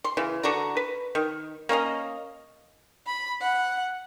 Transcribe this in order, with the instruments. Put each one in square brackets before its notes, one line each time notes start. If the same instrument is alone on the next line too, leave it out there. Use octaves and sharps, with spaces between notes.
[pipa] C6
C#3 E3
D3 D4 F#4 A#5
B4
D#3
A#3 C#4 D#5 F5
[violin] B5
F#5